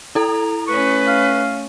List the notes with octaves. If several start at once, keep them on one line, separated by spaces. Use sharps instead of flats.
E4 A4 A#5
A3 C#4 B4 C#6
F5